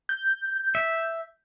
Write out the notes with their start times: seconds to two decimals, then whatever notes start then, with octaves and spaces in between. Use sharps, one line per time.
0.09 G6
0.75 E5